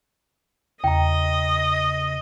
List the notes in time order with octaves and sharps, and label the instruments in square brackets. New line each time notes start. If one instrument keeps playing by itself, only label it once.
[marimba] E2 [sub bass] C#3 [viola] D#5 [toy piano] G5 A#5